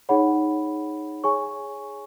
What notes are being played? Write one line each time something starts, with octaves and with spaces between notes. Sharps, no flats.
D#4 G#4 C#5 F#5 B5
G#4 C#5 G#5 C#6